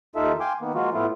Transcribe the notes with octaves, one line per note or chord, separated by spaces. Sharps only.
D#2 D#4 F4 A4 E5
F5 G5 G#5 C6 D6
D#3 A#3 B3
F3 G#3 A#3 F4 F#4
A2 A3 B3 E4 F4